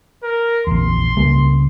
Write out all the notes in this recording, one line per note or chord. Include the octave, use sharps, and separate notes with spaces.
A#4
A#1 E2 C6
C#2 G3 A#3